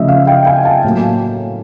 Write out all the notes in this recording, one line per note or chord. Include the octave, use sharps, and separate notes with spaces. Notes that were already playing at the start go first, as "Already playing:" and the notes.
Already playing: C#3 F3 A3 D#5 E5
F5
G5
G#5
A5
A2 F#3 A#3